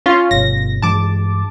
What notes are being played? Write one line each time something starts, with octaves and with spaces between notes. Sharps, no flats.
C#4 F4
G1 B2 A#6
G2 E3 G#3 A5 D6